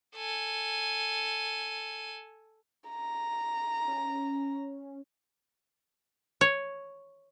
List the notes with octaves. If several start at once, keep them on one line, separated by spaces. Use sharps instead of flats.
A4 G#5
A#5
C#4
C#5